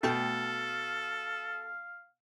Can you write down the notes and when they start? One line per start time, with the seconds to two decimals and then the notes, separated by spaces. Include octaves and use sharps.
0.03 B2 A3 A4 F5 G5 A5